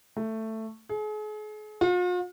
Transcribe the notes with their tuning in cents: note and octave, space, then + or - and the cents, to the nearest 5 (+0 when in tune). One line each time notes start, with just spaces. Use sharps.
A3 +10
G#4 +40
F4 +45